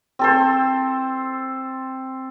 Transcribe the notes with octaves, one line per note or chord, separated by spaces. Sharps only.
C4 A4 C5